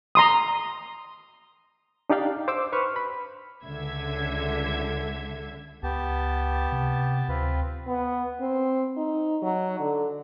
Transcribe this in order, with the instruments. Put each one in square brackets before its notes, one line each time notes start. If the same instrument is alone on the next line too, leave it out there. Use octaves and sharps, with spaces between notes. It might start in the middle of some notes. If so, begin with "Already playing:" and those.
[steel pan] A#5 C6 D#6
[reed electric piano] D4 D#4 G4 D5 F5 G5
C5 D6 E6
B4 C5 C#6 F6
B5
[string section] C#2 D3 E5 G#6
[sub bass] C#2 [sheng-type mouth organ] B3 G4 A5
[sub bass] C3
[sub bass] D2 [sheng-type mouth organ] C4 F4 B4
[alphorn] B3
C4
D#4
F#3
D3